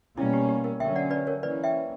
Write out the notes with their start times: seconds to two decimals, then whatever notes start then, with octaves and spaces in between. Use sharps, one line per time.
0.17 B2 G3 A#3 C#4 E4
0.33 G4
0.49 G4
0.64 A#4
0.80 D3 F#3 C#4 E5 G5
0.96 D5 F#5
1.11 B4 D5
1.27 A#4 C#5
1.42 E3 A#3 C#4 B4 D5
1.64 E5 G5